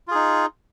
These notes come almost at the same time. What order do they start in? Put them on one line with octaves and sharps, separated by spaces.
F4 G#4 D#4